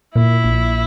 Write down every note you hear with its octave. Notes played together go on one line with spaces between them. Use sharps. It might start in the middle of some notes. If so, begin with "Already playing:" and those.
A#2 E4
A#1